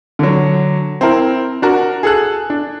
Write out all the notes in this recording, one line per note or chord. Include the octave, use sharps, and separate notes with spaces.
D3 F#3
C4 E4 A#4
D4 F#4 A#4
G#4 A4 F#6
D4